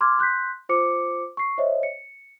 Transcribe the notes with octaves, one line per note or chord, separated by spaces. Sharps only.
C6 D6 F6 G#6
C6 F#6 G6 B6
F4 C5 D6 C#7
C#6 C7
C5 C#5 D#5 E5
C#7